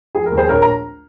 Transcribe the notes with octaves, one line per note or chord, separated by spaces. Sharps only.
F3 G#4
A#4
D#2
G#4 C5
A#1 A#4 C#5
A#5